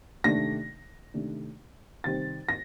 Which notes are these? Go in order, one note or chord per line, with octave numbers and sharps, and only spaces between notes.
C3 D#3 A3 D4 A#6
C3 D#3 A3 D4
C3 D#3 G3 C4 A6
A#6